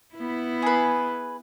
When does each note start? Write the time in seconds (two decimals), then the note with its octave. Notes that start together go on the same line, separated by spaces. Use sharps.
0.15 B3 E4
0.62 G#4 B4